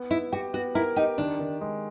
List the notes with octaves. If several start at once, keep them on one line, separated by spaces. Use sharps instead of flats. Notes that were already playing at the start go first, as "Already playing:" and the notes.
Already playing: B3
B3 E4
F#4 G4
B3 F#4
E4 A#4
D#4 G4
D#3 D4
D#3
G#3